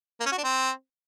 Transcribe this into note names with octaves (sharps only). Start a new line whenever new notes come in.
A#3
C#4
F#4
D4
C4